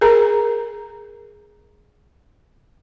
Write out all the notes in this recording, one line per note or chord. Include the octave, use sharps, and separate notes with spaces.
G#4 A#4 A#5